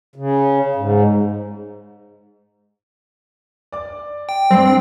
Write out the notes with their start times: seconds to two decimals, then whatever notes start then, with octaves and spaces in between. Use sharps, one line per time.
0.16 C#3
0.76 G#2
3.72 D5 D6
4.29 G5
4.51 G2 C4 D4